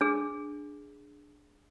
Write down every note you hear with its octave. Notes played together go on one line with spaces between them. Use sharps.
D4 G#4